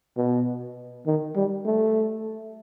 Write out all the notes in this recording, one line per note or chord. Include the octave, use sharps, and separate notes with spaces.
B2
D#3
G3
A3